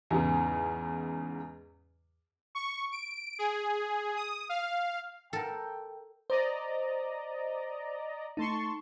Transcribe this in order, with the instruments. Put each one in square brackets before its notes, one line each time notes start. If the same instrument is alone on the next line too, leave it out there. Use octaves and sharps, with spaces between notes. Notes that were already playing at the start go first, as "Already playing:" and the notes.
[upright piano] E2 G#2 C#3
[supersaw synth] C#6
D7
G#4
D#6
F5
[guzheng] A4 A#4 [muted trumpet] G5
[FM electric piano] C5 [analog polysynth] D5 D#5 A#5
[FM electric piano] A3 D#4 [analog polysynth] A5 C6 C#6